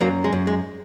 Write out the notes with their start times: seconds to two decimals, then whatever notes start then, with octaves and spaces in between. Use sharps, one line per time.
0.01 F#2 F#3 A#3
0.24 G#3
0.32 F#2
0.47 G#3